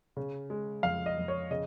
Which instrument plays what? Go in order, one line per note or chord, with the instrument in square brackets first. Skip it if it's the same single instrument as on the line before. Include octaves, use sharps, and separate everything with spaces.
[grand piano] C#3
G#3
F2 F5
D#5
F2
C#5
C#3 D#5